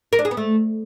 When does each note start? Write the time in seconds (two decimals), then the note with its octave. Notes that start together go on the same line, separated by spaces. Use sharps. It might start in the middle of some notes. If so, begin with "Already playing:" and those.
0.13 A#4
0.19 D4
0.25 G#4
0.31 B3
0.37 A3